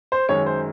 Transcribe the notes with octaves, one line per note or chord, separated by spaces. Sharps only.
C5
F#2 D#3 G#3 C#5
C5